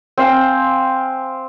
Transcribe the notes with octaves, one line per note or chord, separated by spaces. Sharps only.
C4 F5 G#5